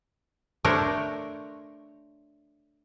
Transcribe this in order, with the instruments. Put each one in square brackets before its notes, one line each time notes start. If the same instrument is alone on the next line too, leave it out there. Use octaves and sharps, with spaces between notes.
[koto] A3 D4 A#4 C5 C#5